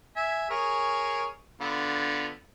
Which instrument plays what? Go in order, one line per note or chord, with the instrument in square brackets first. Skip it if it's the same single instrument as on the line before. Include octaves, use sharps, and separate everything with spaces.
[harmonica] E5 G#5
G#4 A#4 C#5
D3 B3 F4